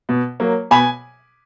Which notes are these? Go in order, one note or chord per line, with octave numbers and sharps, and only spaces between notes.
B2
F#3 A#3
B2 G#5 B5